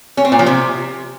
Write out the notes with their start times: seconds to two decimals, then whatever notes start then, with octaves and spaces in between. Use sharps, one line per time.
0.17 C#4
0.25 C4
0.32 A#2
0.39 F3
0.46 C3